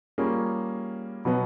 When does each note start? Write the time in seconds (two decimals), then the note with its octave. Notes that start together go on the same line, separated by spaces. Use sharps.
0.18 G3 A#3 C#4 F4 G#4
1.25 B2 F#3 B3